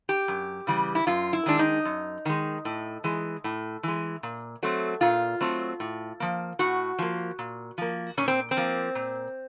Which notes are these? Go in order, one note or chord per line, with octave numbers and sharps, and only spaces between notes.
G4
F#2
C#3 E3 G3
E4
F#2 F4
E4
D#3 G#3 D4
D#4
F#2
D#3 G#3
A2
E3 G#3
A2
E3 G#3
A#2
F#3 A3 C4
A#2 F4
F#3 A3 C4
A2
F3 A#3
A2 F#4
F3 A#3
A#2
F3 A#3
A#2 C#4
C4
C4
F3 A#3
A#2